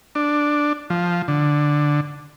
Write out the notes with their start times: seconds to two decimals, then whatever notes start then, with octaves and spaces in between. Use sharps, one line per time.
0.15 D4
0.90 F3
1.28 D3